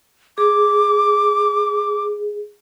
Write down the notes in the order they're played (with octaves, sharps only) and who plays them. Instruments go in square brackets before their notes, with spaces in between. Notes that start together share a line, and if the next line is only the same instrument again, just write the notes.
[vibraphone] G#4 [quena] D6